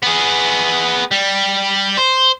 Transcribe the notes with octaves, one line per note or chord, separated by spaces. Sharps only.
B3 G#4
G3
C5